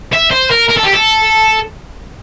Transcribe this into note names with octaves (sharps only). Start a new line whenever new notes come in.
E5
C5
A#4
A#4
A4
G4
A4